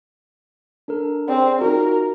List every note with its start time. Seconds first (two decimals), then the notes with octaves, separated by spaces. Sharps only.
0.88 D4 A4 A#4
1.28 C4 G#4 C#5 D5
1.61 D#4 F4 F#4 A#4